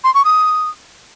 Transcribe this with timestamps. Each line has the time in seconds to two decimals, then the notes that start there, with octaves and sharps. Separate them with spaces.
0.04 C6
0.14 C#6
0.25 D#6